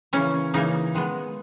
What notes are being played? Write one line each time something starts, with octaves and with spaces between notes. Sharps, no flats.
C#3 E3 A#3 C#4
C#3 E3 A#3 D#4
D#3 G#3 B3